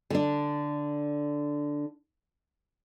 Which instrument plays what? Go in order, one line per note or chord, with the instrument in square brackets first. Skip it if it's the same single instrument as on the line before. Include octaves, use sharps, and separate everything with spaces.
[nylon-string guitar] D3 D4